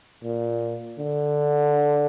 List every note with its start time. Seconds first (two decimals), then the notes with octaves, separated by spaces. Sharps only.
0.24 A#2
0.99 D3